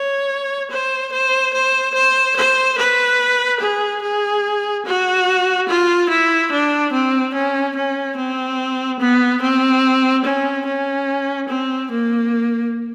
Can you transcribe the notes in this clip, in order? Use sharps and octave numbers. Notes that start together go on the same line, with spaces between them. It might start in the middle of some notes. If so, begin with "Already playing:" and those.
Already playing: C#5
C5
C5
C5
C5
C5
B4
G#4
G#4
F#4
F4
E4
D4
C4
C#4
C#4
C4
B3
C4
C#4
C#4
C4
A#3